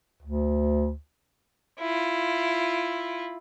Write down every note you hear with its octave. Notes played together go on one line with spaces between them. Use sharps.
D2
E4 F4